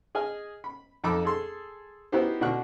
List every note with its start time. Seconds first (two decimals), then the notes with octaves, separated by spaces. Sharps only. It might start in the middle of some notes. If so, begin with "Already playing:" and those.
0.15 G#4 D#5 G#5 F6
0.64 B5
1.04 F2 D#4 A4 B5 D6
1.25 G#4 A4 C6
2.12 B3 D#4 E4 F#4 G4 C5
2.41 B2 D3 F#4 F#5 C#6 F#6